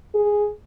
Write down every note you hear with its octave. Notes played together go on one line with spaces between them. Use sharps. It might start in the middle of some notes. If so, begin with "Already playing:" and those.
G#4